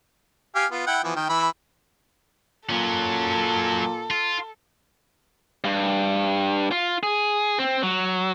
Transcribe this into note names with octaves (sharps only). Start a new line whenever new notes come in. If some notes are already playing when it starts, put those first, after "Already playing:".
G4 F5 G#5
B3 F4
E4 F#5 G5
E3 F3 B3
D#3 G5
E3 E5 B5
A#2 F#3 C#4 A4
F4
G2
F4
G#4
C4
F#3